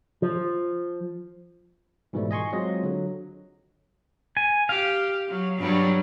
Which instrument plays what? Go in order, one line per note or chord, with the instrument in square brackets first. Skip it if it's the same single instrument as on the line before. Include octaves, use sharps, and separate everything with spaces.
[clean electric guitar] F3
[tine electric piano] G#2 B2 E3 F3 G3 A3
D#5 G#5 C6 C#6
F#3 G#3 C4 F4 D#5
D3 F#3
[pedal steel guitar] G#5
[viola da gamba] G4 [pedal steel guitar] F5
[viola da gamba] F#3
G2 F#3 G3